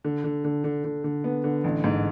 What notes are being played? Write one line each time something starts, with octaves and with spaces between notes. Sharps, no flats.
D3
D3
D3
D3
D3
D3
B3
D3
A1
G#2